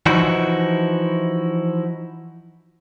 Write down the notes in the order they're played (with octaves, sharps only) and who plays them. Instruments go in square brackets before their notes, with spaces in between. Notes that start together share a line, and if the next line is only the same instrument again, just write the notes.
[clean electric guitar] E3 F3 D#4 E4 F#4